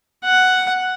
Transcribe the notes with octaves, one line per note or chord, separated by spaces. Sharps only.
F#5